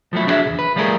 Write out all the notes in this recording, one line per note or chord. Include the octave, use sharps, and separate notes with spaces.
F3 F#3 A3 E4
D4 E4 F#4 G#4 E5
B1 E2
B4
F3 G3 A3 G#4 A#4